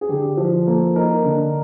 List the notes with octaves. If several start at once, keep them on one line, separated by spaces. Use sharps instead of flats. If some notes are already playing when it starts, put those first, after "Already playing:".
G#4
D3 G4
F3
A#3 A4
D#4 A#4
D3